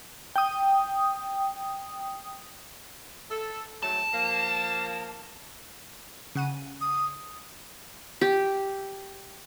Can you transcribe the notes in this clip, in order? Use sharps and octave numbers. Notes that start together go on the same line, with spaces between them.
G5 D#6
A4
G#2 F#3 A3 A5
F3 A#3
C#3 F#5 D#7
D#6
G4